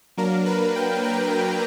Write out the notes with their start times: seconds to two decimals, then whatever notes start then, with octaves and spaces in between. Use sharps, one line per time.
0.17 F#3 A#3 D4 A#4
0.46 B4
0.76 G5
1.04 A#5